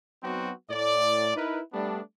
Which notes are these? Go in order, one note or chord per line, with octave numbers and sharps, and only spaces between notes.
F#3 B3 C4 D#4 F#4
A2 D5
D#4 E4 A#4 B4
G3 A3 B3 D4